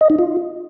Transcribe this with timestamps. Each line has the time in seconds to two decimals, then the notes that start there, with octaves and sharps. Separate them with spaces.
0.01 D#5
0.10 D#4
0.19 F4